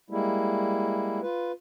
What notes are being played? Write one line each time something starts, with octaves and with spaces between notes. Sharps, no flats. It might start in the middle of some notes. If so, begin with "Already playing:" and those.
G3 G#3 A#3 E4
F4 B4